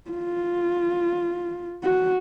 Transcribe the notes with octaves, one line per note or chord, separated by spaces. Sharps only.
F4
F#4